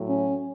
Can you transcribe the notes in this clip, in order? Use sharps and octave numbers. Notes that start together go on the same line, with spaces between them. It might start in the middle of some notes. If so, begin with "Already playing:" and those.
Already playing: A2 F#3
C#4